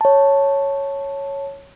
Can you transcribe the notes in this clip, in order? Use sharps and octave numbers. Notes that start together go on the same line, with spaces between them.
C#5 A5